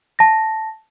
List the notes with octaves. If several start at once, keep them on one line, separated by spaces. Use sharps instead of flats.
A5 A#6